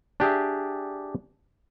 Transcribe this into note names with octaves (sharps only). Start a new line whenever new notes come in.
D4 G4 G#4 E5